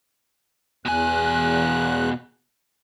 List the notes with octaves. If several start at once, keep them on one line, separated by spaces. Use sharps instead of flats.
E2 B2 G#5 F#6